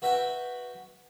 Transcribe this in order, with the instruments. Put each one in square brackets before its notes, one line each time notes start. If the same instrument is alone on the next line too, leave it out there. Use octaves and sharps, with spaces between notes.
[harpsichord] F#4 B4 E5 F#5 G5 B5